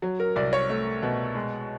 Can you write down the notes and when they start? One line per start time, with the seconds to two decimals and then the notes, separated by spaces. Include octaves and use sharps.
0.02 F#3
0.20 A#4
0.36 C2 D5
0.53 C#5
0.70 A3
1.02 B2
1.35 G#3